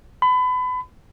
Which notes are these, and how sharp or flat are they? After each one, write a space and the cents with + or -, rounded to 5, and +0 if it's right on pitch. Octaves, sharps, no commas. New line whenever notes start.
B5 +30